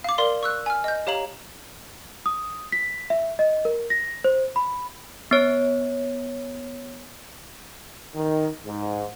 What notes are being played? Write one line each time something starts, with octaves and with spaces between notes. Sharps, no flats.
F5 D6
A#4 D5 F5 C6
C#6 E6 F#6
G#5 F6
D#5 G6
G4 C#5 F5 A#5 F#7
D#6
B6
E5
D#5
A#4
A#6
C5
B5
B3 C#5
D#3
G#2